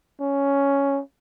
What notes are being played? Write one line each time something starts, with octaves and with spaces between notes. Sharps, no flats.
C#4